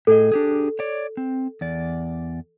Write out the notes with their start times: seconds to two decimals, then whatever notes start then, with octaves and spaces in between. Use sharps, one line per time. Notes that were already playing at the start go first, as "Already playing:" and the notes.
0.07 A2 G#4 A4 D#5
0.32 D4 G4 G#4
0.79 C#5 D5
1.17 C4
1.61 E2 D5